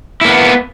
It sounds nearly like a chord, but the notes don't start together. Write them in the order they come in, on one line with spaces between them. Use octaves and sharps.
E4 A#3 B3